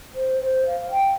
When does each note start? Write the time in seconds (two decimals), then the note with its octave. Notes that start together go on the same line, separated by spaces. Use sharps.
0.15 C5
0.40 C5
0.66 F5
0.91 G5